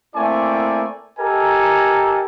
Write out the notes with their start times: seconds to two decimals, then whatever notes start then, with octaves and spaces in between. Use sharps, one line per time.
0.15 A3 A#3 C4 E4 D5 G#5
1.19 G4 A4 A#4 D#5 G#5 A#5